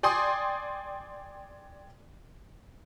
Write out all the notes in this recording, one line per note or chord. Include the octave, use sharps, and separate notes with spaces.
D5 G5 G#5 C6 D#6